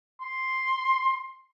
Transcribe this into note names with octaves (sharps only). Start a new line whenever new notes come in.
C6